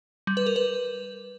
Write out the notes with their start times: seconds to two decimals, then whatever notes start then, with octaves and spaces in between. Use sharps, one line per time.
0.27 G3
0.37 B4
0.46 A#4
0.56 B4